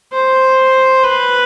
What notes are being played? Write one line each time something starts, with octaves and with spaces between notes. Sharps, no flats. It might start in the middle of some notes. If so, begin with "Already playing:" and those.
C5
B4